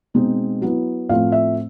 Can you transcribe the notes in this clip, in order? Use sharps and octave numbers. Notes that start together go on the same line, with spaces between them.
B2 G#3 C4 D#4
F#3 B3 E4
A2 F3 A3 C4 F5
E5